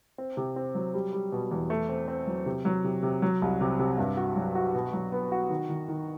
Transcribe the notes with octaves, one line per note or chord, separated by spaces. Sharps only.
C4
C3
C4
F#3
G3
G3
B2
E2
A3
C4
C4
F#3
C3
F#3
C3
C3
F#3
C2
C3
C3
G2
F#4
F#3
F#4
B2
F#3
B3
F#4
D#3
D#3
D#3